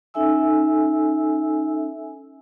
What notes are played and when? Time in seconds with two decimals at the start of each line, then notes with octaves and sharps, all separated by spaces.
0.14 C#4 D#4 A4 E5 G#5 E6